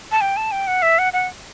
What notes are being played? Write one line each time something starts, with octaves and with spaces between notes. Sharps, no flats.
A5
G5
A5
G5
F#5
E5
F#5
F#5